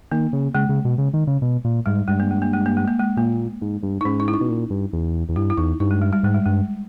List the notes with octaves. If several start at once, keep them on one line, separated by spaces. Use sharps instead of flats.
D#3 A#3
C#3
C#3 G#3
C#3
B2
C#3
D#3
C#3
B2
A#2
G#2 G3
G2 G#3
A#3
G#3
A#3
G#3
A#3
G#3
A#3
G#3
A#2 A#3
G#2
G2
D#4
G#2 C#4
D#4
E4
D#4
B2
A#2
G2
E2
E2
G2 E4
E4
E2 D#4
G2 D#4
G#3
G3
G3
G#2 G#3
G3
G2 G#3